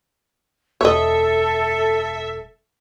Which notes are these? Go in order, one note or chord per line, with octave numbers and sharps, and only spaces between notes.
E1 F#2 A4 C#5 D#5 E5